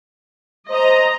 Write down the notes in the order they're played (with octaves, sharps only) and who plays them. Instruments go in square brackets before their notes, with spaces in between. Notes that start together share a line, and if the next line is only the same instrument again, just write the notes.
[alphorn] C5 [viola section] D#5 A#5